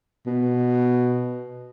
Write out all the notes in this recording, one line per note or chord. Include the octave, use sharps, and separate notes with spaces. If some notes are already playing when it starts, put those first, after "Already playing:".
B2